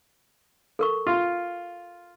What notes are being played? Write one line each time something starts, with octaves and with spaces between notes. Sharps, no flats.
A4 A#4 C#6
F4